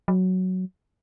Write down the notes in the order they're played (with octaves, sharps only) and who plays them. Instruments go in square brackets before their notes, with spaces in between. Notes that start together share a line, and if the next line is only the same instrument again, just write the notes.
[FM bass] F#3